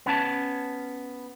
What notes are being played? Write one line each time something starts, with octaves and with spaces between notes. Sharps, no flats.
B3 C#4 A5